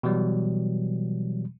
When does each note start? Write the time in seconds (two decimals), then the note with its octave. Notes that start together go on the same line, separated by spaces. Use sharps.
0.03 B2 E3 F#3 G3